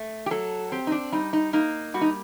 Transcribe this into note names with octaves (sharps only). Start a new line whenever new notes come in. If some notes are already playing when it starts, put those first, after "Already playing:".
Already playing: A3
G4
F#3 A4
C4 G4
D#4
D4
G3 D#4
D#4
A#3 D#4
G3 F#4
D#4